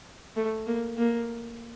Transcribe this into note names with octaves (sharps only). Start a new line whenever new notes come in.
A3
A#3
A#3